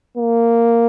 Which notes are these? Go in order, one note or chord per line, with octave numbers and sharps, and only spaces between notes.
A#3